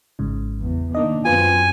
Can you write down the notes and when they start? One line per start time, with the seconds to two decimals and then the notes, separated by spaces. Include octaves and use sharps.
0.19 G#1 G#2 C#3
0.61 E2
0.95 D#3 A#3 D4 D#4 D#5
1.25 F#2 C4 F4 B4 G#5